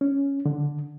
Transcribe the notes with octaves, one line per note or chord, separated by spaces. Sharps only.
C#4
D3